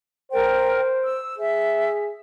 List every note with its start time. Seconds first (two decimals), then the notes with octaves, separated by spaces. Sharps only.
0.32 A#4 C5 G5
1.05 E6
1.38 G#4 E5